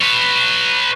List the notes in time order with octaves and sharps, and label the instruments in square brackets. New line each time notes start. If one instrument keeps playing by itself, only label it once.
[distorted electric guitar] B4 C#5